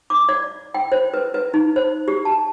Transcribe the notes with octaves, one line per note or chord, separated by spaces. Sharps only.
D6
D5
G5
C5
B4
B4
D#4
C5
G4
A5